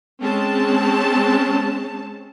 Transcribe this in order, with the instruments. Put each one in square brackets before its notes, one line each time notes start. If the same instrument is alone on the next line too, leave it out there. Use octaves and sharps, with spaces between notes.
[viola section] G#3 C4 C#4 A5